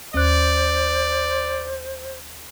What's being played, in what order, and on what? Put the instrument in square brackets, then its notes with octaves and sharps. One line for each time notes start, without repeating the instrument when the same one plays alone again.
[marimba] D#2 F#6 [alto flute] C5 [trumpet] D5